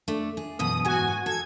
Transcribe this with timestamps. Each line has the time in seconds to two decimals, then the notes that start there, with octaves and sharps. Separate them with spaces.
0.08 A3 D4 D5
0.37 G#4
0.59 F#2 B2 E3 D#6
0.85 G#2 E3 F#4 G#5
1.26 A4 G#6